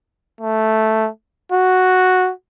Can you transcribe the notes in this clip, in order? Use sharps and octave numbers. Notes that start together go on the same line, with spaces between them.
A3
F#4